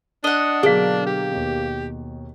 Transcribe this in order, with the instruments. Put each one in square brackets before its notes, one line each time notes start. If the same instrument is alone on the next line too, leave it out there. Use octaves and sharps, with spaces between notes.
[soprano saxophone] D4 [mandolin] D#5 F#5
[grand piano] B2 D3 F#3 [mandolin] A#3 [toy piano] G#4 F5
[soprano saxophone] G4
[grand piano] D#2 B2